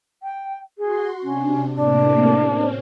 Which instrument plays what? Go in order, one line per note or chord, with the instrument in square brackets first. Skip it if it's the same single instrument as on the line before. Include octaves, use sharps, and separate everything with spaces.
[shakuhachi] G5
[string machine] F#4 C6 [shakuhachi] G#4
[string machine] C3 D4 [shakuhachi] C#4
[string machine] A2 C3 A#3 [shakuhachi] D4
[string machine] C4 C#4